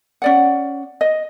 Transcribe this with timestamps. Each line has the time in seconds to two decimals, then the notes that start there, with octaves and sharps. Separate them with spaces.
0.22 C#4 D5 F#5
1.01 D#5